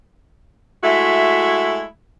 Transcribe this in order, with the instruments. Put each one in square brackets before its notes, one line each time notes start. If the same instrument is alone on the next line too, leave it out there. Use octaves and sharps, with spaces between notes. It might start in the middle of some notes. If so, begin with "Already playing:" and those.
[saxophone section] G#3 A3 E4 F#4 E5